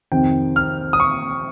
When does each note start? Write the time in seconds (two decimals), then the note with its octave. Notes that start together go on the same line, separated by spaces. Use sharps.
0.12 F2 C3 D#3 G5
0.56 F6
0.93 D#6
1.00 C#6